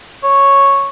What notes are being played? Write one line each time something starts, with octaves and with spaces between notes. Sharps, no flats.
C#5